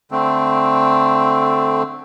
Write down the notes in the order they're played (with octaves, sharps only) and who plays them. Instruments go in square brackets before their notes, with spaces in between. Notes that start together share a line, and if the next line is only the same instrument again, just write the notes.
[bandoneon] D3 A3 C4